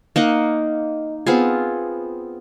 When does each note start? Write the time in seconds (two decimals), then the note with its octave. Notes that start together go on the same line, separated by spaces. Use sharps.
0.16 A#3 D#4 D#5 F#5
1.27 B3 C4 F4 G#4